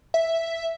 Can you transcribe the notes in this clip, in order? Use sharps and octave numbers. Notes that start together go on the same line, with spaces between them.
E5